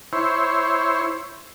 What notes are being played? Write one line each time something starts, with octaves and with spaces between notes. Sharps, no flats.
E4 C5 C#5